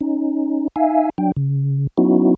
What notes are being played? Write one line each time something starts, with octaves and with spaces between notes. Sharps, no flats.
C#4 D#4
D#4 E5 F5 G#5
F#3 D4 G5
C#3
F#3 B3 C#4 D#4 E4 F#4